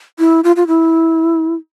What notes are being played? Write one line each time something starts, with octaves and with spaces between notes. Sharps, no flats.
E4
F4
F4
E4